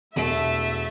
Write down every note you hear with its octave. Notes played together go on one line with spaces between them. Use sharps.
E1 A3 E5